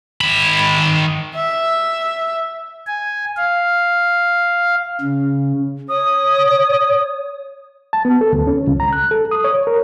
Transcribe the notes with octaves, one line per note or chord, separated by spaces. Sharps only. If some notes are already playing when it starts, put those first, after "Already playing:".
D#3 B5
E5
G#5
F5
C#3
C#5 D#6
A5
B3
A4
D2
C#4
C#2
A#5
F#6
A4
D#6
C#5
A#4